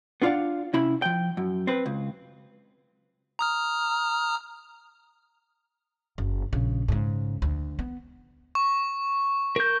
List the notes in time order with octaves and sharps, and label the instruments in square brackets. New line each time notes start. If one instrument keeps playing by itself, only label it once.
[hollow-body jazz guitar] B3 D4 F4 D5 F5 F#5
C3 C#4 E4 B5
F3 G5
F#2
C4 B4
C#2
[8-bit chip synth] A#5 D#6 F6
[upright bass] F#1
A#1 C#3
G#2 C#3
D2
B3
[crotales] C#6
[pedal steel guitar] A#4 G6